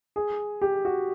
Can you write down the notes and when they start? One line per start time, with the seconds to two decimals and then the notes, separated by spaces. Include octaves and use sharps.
0.16 G#4
0.62 G4
0.85 F#4